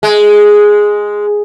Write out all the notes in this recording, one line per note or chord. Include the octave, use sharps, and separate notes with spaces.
G#3